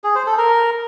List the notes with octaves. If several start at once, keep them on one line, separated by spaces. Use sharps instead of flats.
G#4
C5
A4
A#4